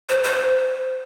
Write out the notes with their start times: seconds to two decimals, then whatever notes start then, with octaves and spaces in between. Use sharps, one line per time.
0.09 C5
0.24 C5